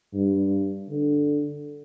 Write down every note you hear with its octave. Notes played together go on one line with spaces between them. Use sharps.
G2
D3